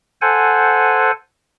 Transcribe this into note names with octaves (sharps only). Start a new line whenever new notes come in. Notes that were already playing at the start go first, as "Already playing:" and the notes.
A4 C5 F#5 G#5